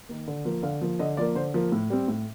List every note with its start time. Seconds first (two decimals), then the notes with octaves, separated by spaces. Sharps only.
0.09 D#3 A#3
0.28 D3
0.45 F3 A#3
0.63 D3 F5
0.81 F3 A#3
0.99 D3 D#5
1.17 F3 A#3 D5
1.35 D3 C5
1.54 F3 A#3
1.72 A2
1.90 G3 C4
2.08 A2